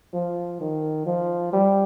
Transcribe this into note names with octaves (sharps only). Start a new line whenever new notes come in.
F3
D#3
F3
G3